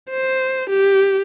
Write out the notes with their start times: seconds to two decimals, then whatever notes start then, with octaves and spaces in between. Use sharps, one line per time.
0.11 C5
0.70 G4